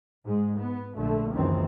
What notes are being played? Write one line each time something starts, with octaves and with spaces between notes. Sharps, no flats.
G#2 G#3
B3
A#1 D3 A3
F#1 C#2 F#2 D#3 E3 C4